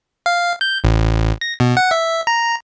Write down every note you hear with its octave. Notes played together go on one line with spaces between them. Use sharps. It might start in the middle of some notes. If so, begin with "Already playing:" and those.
F5
G6
A1
A#6
B2
F#5
E5
A#5